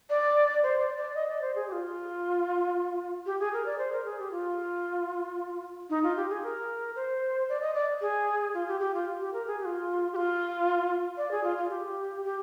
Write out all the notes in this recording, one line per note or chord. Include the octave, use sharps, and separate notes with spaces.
D5
C5
D5
D5
D#5
D5
C5
G#4
G4
F4
G4
G#4
A#4
D5
C5
A#4
G#4
G4
F4
D#4
F4
G4
G#4
A#4
C5
D5
D#5
D5
G#4
F4
G4
G4
F4
G4
A#4
G#4
G4
F4
G4
F4
D5
G#4
F4
F4
G4
G4